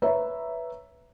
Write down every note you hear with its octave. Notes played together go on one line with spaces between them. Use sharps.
B4 C#5 E5 A#5